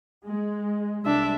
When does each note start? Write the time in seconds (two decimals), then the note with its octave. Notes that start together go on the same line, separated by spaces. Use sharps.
0.25 G#3
1.05 C2 G#3 D4 E5